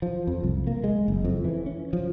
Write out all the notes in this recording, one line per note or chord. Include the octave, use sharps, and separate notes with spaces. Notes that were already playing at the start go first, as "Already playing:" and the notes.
F3
F2
C2
A#3
G#3
F#1
F2
E3
C#4
F3